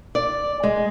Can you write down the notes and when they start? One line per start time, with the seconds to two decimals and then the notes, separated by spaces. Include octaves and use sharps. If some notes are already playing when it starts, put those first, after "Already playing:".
0.15 D5
0.63 G#3